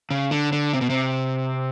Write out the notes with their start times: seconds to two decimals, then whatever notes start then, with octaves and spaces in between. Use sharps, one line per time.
0.10 C#3
0.31 D3
0.52 D3
0.73 C3
0.81 B2
0.90 C3